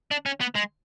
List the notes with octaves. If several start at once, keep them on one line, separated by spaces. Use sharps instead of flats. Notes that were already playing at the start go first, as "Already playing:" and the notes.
D4
C#4
B3
G#3